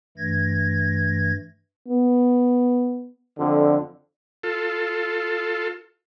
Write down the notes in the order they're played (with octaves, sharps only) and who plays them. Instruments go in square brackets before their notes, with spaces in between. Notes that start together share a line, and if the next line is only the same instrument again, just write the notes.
[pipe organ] G2 E3 A3 G#6 A#6
[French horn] B3
[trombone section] F2 D3
[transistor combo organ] F4 A4